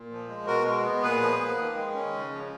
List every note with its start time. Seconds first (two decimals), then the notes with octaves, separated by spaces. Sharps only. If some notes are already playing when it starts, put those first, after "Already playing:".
Already playing: A#2
0.11 F3
0.28 G#3
0.47 B2 F#4 A#4
0.65 G#3
0.84 B3
1.02 A#2 G#4 B4
1.21 F3
1.39 A#3
1.58 D#3
1.76 G#3
1.95 C#4
2.13 C#3
2.31 F3